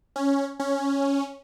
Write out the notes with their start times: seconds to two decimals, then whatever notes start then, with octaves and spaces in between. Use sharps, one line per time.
0.16 C#4
0.60 C#4